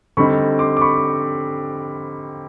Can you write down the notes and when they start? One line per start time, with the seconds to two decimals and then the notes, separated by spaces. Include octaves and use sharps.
0.17 D3 G3 C4 D#4 B5 C#6
0.59 C6 D6
0.77 D6
0.81 B5 C#6